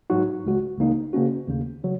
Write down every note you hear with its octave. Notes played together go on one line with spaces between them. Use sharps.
G#2 F#3 D#4 F#4
C#2 C#3 G#3 F#4
C#2 C#3 A#3 D#4
C#3 A#3 C#4 F#4
D#2 C#3 A#3
C#3 F#3